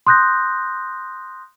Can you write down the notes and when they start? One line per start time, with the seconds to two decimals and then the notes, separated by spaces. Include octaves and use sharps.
0.07 C6 D#6 F#6 G6 A#6